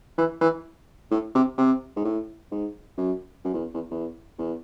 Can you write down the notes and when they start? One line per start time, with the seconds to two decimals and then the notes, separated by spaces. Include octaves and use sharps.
0.18 E3
0.41 E3
1.11 A2
1.35 C3
1.58 C3
1.97 G#2
2.05 A2
2.52 G#2
2.98 F#2
3.44 F#2
3.54 E2
3.74 E2
3.91 E2
4.38 E2